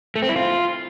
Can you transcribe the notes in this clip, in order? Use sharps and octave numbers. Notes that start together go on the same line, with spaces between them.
A3
C4
E4
F4